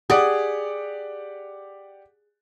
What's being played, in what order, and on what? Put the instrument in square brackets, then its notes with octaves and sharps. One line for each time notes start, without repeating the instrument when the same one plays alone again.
[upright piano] G4 D5 F#5 [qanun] G#4